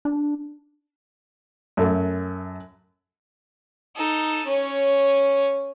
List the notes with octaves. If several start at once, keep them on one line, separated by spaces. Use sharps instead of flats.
D4
F#2 A3
D#4 A4
C#4 C#5